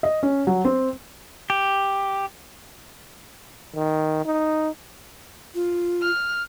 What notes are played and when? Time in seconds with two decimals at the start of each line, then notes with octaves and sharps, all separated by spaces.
0.03 D#5
0.23 C#4
0.47 F#3
0.65 C4
1.50 G4
3.76 D#3
4.25 D#4
5.55 F4
6.02 F6